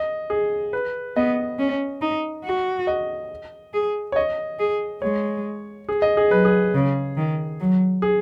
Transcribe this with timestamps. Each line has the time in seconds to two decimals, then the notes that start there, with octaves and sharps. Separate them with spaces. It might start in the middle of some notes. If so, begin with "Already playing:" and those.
Already playing: D#5
0.30 G#4
0.73 B4
1.16 B3 D#5
1.59 C#4
2.02 D#4
2.45 F#4
2.87 D#5
3.73 G#4
4.12 C#5
4.16 D#5
4.59 G#4
5.02 G#3 C#5
5.89 G#4
6.02 D#5
6.17 G#4
6.31 F#3 B4
6.45 G#4
6.74 C#3
7.17 D#3
7.60 F#3
8.02 G#4